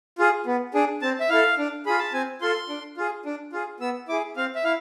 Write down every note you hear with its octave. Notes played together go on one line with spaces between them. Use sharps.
F4 G#4
B3
D4 G#4
C4 A5
E5
E4 A4 F5
D4
F4 G#4 B5
A5
C4 G#5
F4 A4 C6
D4
F4 G#4
D4
F4 G#4
B3 E6
E4 G#4 D6
C4 F5
E5
E4 F5